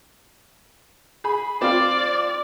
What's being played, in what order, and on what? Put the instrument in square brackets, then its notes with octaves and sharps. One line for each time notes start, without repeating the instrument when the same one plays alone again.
[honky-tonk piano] G#4 B5
[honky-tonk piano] C4 F4 F5 [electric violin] D5